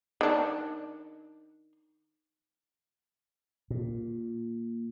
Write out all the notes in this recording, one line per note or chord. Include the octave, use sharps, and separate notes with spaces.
D#3 D4
A#2